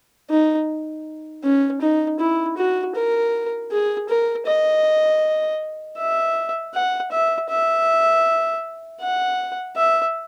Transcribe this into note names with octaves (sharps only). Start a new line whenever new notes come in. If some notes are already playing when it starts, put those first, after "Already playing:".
D#4
C#4
D#4
E4
F#4
A#4
G#4
A#4
D#5
E5
F#5
E5
E5
F#5
E5